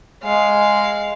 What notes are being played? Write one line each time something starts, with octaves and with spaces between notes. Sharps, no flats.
G#3 F5